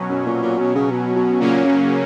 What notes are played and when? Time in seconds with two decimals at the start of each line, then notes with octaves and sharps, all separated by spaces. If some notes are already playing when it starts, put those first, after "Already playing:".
Already playing: B2 F#3 C#4
0.09 F#2
0.26 A#2
0.43 A#2
0.58 B2
0.75 C#3
0.91 B2
1.16 B2
1.40 A#2 C#3 F#3 A#3 C#4
1.64 F#2